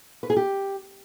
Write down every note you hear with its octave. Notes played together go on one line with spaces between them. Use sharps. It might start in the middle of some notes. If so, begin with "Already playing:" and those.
B4
G#4
G4